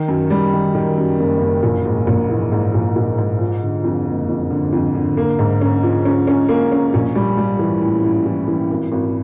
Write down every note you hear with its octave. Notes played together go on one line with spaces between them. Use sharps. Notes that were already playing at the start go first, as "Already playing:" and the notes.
Already playing: D#3
F#2
G3
D#3
D#3
F#2
F#1
F#1
A#1
G#2
A#1
E3
G#2
A#1
A#1
G#2
F3
D3
F2
F#1
F2
D3
F2
D3
A#3
G#2
C#4
F3
C#4
C#4
A#3
C#4
A#1
G3
G3
E3
A2
A2
E3
E3
G#1
G#1